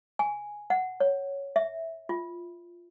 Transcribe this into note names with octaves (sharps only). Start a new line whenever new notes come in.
G#5
F#5
C#5
E5
F4